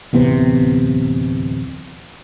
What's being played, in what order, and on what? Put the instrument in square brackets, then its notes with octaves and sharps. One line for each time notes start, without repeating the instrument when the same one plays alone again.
[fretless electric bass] D1 E2 C3 B3